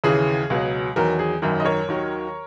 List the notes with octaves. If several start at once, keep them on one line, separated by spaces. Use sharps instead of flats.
D#2 C#3 E3 G#4
C#2 B2 F#3
E2 D#3 F#3 A#4
G#4
G#1 F#2 D#3 F#3 A#4
D#5
A#4 C#5
D#2 D#3 F#3